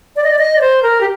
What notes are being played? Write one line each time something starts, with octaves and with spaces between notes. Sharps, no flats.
D5
D#5
D5
D#5
D5
C5
A#4
G4